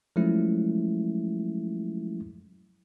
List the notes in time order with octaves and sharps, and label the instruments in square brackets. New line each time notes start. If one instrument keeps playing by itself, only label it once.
[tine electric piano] F3 F#3 G#3 A3 C#4 E4